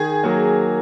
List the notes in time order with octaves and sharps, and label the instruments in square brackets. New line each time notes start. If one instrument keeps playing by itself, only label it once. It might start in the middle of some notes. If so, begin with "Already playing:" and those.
Already playing: [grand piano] D#3 [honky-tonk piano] G#4
[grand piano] F#3 A#3